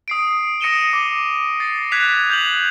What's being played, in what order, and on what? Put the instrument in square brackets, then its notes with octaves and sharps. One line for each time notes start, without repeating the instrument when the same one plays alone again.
[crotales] D#6 C7 D7
D#6 A#6 C#7 D#7 E7 G7
D6
A6 C7
F#6 G#6 B6 E7 F7
G6 F7 F#7